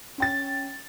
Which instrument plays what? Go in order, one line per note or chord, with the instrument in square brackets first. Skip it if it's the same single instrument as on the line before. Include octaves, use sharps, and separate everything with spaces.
[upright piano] C#4 G5 A6